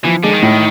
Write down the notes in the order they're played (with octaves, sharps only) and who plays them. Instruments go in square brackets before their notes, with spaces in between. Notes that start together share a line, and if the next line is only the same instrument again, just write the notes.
[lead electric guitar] E3 [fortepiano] F3
[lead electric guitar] D3 [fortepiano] G#3
[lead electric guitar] D#3
[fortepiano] A2